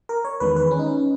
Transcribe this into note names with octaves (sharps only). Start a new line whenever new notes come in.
A#4
C#5
E2 D#3 G#3 B4
B4
C#4
D#4
C#4